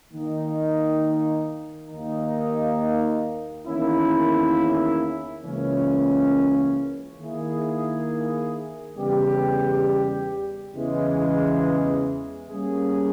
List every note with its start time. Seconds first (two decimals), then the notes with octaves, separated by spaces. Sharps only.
0.13 D#3 A#3 D#4
1.90 D#2 D#3 A#3 D#4
3.66 E2 D#3 A#3 C#4 E4
5.43 C#2 C#3 E3 A#3 C#4
7.20 D#3 A#3 E4 G#4
8.97 E2 C#3 G3 B3 G4
10.74 E2 C#3 E3 G#3
12.50 G3 A#3 C#4 G#4